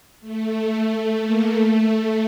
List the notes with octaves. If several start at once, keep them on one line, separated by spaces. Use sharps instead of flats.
A3
A3
A#3
A3